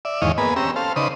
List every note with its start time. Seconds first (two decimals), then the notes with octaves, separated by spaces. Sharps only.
0.05 D5 E5
0.22 E2 G#2 D#3 C#5 D#5 F5
0.38 A#3 B3 G#4 B4
0.56 C4 C#4 G4 A#5 E6
0.76 A4 C5 F5
0.96 C#3 D#4 B4 C5 D5 D#6